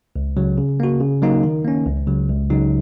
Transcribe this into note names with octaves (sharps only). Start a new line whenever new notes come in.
C#2
C#3 F#3
C#3
A#3 F#4
C#3
F#3 A#3 D#4
D#3
A#3 C#4
C#2
C#3 F#3
C#2
C#3 F#3 D#4